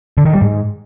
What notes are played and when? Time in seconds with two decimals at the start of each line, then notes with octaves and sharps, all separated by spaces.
0.18 D3
0.25 D#3
0.33 G3
0.41 G#2